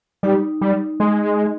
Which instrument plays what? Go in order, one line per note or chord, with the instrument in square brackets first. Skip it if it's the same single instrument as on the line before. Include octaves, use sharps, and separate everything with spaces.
[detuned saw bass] G3 [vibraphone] D#4
[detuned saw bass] G3
G#3